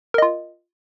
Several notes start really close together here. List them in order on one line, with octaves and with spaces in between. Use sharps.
A#4 D#5 F4